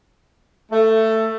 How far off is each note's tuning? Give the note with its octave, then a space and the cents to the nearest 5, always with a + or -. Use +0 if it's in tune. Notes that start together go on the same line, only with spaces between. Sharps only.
A3 +10